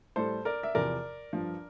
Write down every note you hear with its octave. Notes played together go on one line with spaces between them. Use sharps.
A2 G3 A4 C5
A#4 D5
E5
E2 C3 F3 A#4 D5
G2 F3